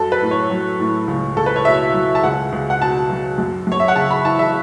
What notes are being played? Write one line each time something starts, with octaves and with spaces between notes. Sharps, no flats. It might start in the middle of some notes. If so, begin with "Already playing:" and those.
Already playing: F#2 F#3 A4
B4
A2
C#5
F#3
A2
C#2
C#2 A4
B4
C#5
B2 E5
F#3
A5
C#2 F#5
C#2
F#5
B2 A5
F#3
F#2
F#2 C#5
E5
F#5
C#3 A5
B5
E3 A5
E5